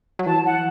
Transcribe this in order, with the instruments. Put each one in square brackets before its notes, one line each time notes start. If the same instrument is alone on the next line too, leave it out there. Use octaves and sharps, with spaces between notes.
[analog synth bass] F#3
[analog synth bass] E3 [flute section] A5
[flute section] F#5